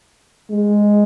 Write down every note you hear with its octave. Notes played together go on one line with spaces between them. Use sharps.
G#3